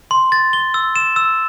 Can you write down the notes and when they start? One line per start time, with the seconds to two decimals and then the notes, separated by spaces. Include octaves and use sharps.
0.11 C6
0.32 A6
0.53 G7
0.74 E6
0.96 E7
1.16 E6